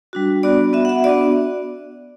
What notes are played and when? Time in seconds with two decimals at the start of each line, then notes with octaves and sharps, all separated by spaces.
0.13 G3 D4 F#4
0.43 B3 D4 F#4 D5
0.73 B3 F#4 E5
0.85 F#5
0.89 E5
1.04 B3 D4 F#4 D5